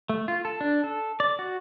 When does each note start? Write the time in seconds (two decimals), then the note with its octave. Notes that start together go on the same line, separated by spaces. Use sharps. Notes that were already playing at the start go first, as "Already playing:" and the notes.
0.09 A3
0.28 F4
0.45 A4
0.61 D4
0.84 A4
1.20 D5
1.39 F#4